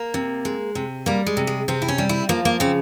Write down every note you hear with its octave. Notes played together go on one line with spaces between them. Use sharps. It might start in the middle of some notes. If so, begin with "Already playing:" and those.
Already playing: A#3
C3
G#3
C3
G3 A#3
G#3
C3
G#3
C3 C4
E4
C#4
G3
E4
F3 A#3
A#3
C#3 C4